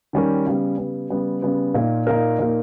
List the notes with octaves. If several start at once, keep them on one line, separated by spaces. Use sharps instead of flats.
D#3 G3 C#4 G4 A#4
C#3 G3 B3
C#3 G3 B3
C#3 G3 B3
C#3 G3 B3
A#2 A#3 D#4 A#4
A#2 A#3 D#4 A#4
A#2 A#3 D#4 A#4